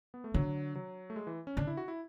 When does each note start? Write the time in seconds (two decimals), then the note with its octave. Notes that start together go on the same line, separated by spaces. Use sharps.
0.14 B3
0.24 A3
0.34 D3 F#3
0.75 F#3
1.10 A3
1.16 G#3
1.27 E3
1.47 C#4
1.57 D3 D4
1.67 E4
1.77 F#4
1.88 E4